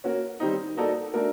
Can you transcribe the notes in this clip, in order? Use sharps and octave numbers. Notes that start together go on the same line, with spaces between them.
A#3 C#4 F#4 A#4
D#3 G3 C4 D#4
A#3 D#4 F#4 A4 D5
A3 D4 F#4 A#4